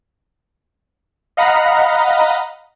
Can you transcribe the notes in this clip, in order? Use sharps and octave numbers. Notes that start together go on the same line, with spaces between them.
D#5 F5 F#5 A#5 B5